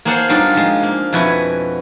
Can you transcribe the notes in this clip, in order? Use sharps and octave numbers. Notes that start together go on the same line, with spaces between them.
A#3 G#4 C5 C#5 F#5 A5
F#3 G3 D4 D#4 F4
F3 G#3
A#3
F2 B2 E4 F#4 B4 G#5